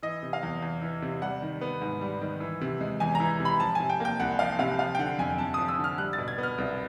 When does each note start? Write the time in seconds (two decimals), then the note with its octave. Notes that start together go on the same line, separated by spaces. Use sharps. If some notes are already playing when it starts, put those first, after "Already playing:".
0.03 E3 D#5
0.23 C3
0.33 F5
0.43 E2
0.62 E2
0.82 E3
1.02 C3
1.22 G3 F#5
1.42 D#3
1.61 B3
1.81 G#2
2.01 G3
2.21 D#3
2.40 E3
2.61 C3
2.81 G#3
3.00 E2 G#5
3.15 A#5
3.20 E3
3.40 C3
3.45 B5
3.60 F3 A5
3.75 C3 G#5
3.90 G5
4.00 A#3 G5
4.20 C2 F#5
4.39 F3 F5
4.59 C3 F5
4.79 F3 F5
4.95 G5
4.99 D3 F#5
5.18 F2 G#5
5.38 F2 A5
5.54 F3 D#6
5.68 E6
5.78 D3
5.84 F6
5.98 G3 F#6
6.13 A6
6.18 B2
6.28 G#6
6.38 B3
6.43 F6
6.58 C2